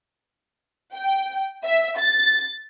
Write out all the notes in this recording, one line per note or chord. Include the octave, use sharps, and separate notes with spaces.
G5
E5
A6